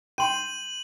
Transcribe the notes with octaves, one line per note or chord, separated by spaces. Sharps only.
G5 C6 D#7 F#7